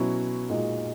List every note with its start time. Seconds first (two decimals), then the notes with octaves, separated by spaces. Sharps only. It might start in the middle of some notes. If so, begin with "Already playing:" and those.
Already playing: B2 F#3 C#4 E4
0.49 A#2 G#3 D#4 F#4